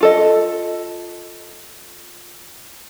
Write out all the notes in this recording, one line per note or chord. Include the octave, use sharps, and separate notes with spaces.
F4 A4 D#5